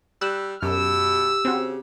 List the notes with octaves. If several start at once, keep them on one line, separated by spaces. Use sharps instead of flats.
G3 E6 F#6
F#2 B2 G4 E6
C#3 C4 F#4